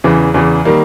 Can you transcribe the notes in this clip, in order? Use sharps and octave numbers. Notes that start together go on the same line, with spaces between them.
E2 C#3 E3
E2 C#3 E3
D#3 G3 A#3